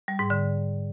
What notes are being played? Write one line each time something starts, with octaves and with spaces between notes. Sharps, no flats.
G3
G#2
D3